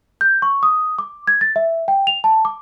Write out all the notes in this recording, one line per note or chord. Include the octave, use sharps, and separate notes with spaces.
G6
C#6
D#6
D6
G#6
A6
E5
G5
F7
A5
D6